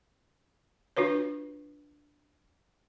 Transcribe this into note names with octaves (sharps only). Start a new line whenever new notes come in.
D4 F4 F#4 B4 C#5